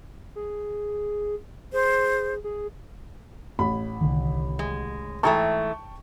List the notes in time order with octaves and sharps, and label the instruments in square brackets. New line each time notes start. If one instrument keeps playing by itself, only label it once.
[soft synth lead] G#4
[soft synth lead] G#4 [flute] C5
[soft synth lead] G#4
[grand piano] A1 B5
[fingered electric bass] C2 D3 D#3
[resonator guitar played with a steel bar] G#3
[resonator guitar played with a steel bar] G#2 E3 A3 [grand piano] G5 A5 C#6